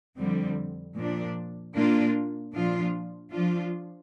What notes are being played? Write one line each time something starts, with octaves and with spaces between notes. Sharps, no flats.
F2 D3 G3 C4
A#2 F3 D4
A#2 A#3 D4 F4
A#2 F3 D4 F4
F3 D4 F4